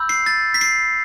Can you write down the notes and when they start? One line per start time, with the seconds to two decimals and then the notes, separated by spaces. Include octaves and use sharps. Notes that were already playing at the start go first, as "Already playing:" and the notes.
Already playing: B5 E6 G6
0.09 C7
0.26 A6
0.54 B6
0.61 C7